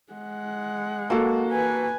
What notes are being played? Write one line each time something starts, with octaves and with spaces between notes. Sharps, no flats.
G#3 F#5
A#3 F#4 A4
B4 G#5